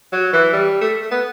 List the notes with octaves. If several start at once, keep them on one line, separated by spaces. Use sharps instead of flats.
F#3
E3
G3
A3
A3
B3